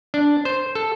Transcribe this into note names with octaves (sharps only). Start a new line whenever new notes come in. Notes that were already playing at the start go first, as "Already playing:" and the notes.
D4
C5
A4